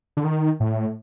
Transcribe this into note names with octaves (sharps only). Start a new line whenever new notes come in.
D3
D#3
A2